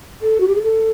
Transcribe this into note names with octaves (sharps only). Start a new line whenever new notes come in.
A4
F#4
G4
G#4
A4